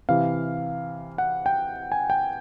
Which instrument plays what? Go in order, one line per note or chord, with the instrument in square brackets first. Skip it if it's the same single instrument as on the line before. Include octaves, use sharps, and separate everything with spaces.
[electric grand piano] C3 E3 F5
F#5
G5
G#5
G5